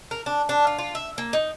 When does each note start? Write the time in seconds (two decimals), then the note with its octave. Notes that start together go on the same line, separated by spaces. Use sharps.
0.11 A#4
0.26 D4
0.49 D4
0.67 F4
0.78 F4
0.95 E5
1.18 A#3
1.33 D#4